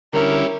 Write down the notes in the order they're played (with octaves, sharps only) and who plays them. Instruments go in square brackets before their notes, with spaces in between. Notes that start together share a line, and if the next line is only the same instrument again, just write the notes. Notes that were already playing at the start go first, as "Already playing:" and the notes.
[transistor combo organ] D3 G3 C#4 E4 [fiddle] A#4